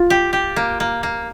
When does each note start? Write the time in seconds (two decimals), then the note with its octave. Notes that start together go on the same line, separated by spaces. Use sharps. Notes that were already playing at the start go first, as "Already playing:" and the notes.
Already playing: F4
0.10 G4
0.33 G4
0.56 A#3
0.80 A#3
1.03 A#3